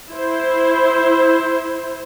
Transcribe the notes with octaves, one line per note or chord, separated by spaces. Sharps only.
E4 C5